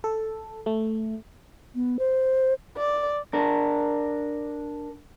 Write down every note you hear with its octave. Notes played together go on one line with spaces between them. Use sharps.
A4
A3
B3
C5
D5
D4 A#4